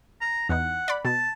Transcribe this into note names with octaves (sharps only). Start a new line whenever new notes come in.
A#5
E2 D#4 F#5
D5 B5
B2 A5